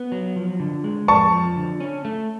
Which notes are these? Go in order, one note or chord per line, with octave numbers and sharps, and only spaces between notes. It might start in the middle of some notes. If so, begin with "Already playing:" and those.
Already playing: B3
F#3
F3
D3
G#3
F2 A5 C#6
F3
D3
C#4
A3